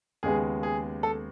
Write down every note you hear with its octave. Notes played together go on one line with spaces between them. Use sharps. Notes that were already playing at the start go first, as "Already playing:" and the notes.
D#2 C#3 G#3 B3 G#4
G#4
A4